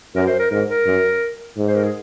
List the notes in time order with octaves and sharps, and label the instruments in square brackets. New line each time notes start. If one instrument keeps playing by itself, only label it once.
[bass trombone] F#2 [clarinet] A#4
[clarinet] C5
A#4
[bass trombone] G#2 [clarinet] A#4
[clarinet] A#4
[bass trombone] F#2
G#2
[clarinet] C5
A#4
G#4